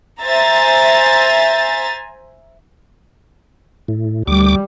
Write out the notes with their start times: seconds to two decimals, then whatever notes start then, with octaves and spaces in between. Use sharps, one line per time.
0.23 C5 E5 G#5 A#5 A6
3.88 A2
4.27 D2 G3 D6